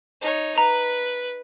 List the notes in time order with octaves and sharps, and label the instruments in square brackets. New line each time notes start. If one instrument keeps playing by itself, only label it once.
[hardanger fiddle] D#4 C#5
[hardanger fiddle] B4 [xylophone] A#5